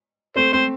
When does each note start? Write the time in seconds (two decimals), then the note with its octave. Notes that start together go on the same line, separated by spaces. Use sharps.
0.36 A3 C4 C5
0.53 A3 C4 C5